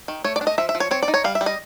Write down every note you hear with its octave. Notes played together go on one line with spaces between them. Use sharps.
D#3
A3 C#5
D5
D4
D#5
F3 E5
E5
F3
C#5
C4 C#5
D5
D#4
C#5
G3 F5
E5
G3
D#5